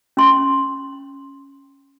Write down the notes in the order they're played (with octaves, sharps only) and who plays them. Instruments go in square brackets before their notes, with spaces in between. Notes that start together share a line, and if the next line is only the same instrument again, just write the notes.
[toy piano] C#4 C6